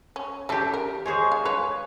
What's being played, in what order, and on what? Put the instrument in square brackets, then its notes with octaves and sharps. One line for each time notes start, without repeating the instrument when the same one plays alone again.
[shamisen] C#4
[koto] E3 G4 [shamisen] C#4 A4
[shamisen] A#4
[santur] G#3 C#6 [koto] G#4 C5 C#5
[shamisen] F5
[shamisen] B4 [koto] C#5